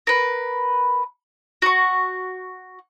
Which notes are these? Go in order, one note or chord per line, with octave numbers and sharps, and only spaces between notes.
A#4 B4
F#4 C#6